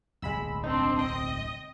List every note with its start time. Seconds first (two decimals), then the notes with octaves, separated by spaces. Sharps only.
0.22 D1 B1 G#3 B5 E6
0.64 C4 D4 D#4
0.99 D#5 G5